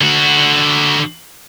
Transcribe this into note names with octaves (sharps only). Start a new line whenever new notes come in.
D3 F#4